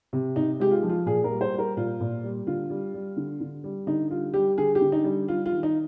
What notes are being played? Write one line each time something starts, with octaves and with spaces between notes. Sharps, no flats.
C3
C3 D#4
G#3 G4
F4
F3
F4
A#2 G#4
A#4
G3
C5
G3
A#4
A#2 F4
A#2
G3
D3 F4
G3
G3
D3
D3
G3
D3 D#4
G3 F4
G3 G4
D3 G#4
G4
D3
D#4
G3
G3 F4
F4
D#3
D#4